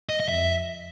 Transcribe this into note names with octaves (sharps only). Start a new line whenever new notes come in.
D#5
D#5
F2 E5